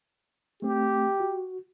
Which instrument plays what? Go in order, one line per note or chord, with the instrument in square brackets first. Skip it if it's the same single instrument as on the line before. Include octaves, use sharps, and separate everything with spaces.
[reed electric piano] A3 C4 [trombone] G4
[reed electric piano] F#4